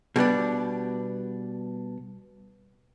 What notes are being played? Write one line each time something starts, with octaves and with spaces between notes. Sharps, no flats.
B2 G3 B3 D4